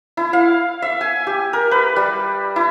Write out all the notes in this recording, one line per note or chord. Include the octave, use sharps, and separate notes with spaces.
E4
F5
E5
G#5
G4
A#4
B4
G3
E4